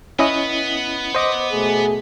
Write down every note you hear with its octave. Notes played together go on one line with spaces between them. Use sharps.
B3 C#4 E4 B4 D#5
C5 D#5 D6
B2 A3 G#4